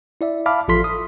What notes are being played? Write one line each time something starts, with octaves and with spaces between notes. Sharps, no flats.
E4 D5 E5
E5 F5 A5 B5 D6 F6
A1 F3 F4 A4 C6 B6
D#6